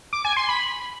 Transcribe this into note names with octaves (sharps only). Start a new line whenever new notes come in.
D6
G#5
C6
B5